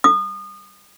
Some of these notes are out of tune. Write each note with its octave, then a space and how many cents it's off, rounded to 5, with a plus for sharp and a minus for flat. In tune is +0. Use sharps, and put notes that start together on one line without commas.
D#6 -30